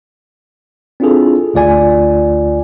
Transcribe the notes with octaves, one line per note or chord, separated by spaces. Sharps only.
C4 D4 E4 F4 G#4 A4
G1 D2 F4 D5 G#5